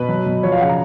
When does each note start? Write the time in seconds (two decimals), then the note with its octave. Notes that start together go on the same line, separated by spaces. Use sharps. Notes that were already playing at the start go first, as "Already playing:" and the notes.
Already playing: B2 B4
0.09 F#3
0.26 B2
0.43 F3 C#5
0.52 F5
0.61 C#3 F#5
0.69 A#5